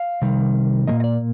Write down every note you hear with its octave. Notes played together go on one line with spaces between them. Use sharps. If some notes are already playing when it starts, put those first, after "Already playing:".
Already playing: F5
C3 D#3 G3
A#2 F3 A#3 D#5
D#5
D5